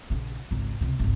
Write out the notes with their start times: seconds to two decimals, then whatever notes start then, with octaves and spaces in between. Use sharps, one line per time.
0.10 A#1 C#3
0.51 G#1 C#2
0.81 C#2 C3
0.99 G#1 C#2